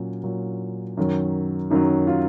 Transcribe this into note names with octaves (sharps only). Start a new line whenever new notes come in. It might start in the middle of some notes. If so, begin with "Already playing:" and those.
Already playing: A#2 F#3 C#4
A#2 F#3
F#2 D#3 F#3
F#2 D#3 F#3 D#4
F4